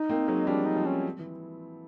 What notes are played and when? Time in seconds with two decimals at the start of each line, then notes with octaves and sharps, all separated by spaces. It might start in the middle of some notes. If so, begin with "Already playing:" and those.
Already playing: D#4
0.09 A#3 C4
0.28 F#3 G#3
0.47 F3 G3 D4
0.66 D#4
0.76 F3
0.86 C#4
1.19 E3